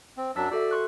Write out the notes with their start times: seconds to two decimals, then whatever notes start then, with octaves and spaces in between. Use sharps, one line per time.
0.17 C4
0.36 F#2 F#3 D4 E6 A6 B6
0.51 F#4 A4 D5 E5
0.71 C6 C#6 F#6